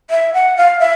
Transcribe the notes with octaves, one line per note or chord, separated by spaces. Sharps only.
E5
F#5
F5
E5